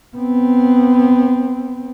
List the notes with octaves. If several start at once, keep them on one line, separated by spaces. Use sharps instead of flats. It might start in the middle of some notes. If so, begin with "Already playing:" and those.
B3 C4